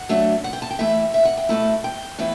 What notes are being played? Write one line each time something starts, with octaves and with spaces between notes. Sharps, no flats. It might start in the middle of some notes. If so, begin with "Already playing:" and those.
Already playing: F#5
F#3 A3 D4
F#5
G5
A5
G5
E3 A3 E4 E5
E5
F#5
G5
B2 A3 E4 A5
G5
A2 E3 B3 E4